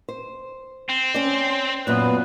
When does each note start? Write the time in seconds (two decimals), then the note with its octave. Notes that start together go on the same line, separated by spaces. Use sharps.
0.09 C5
0.89 C4
1.15 C#4 D5
1.87 F#2 A#2 B3 B4